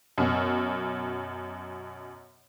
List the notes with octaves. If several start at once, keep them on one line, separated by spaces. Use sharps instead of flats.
F#2 B2